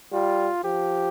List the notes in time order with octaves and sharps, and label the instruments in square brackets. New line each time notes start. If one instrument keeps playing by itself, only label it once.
[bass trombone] G3 [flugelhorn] F4
[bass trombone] F3 [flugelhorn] G4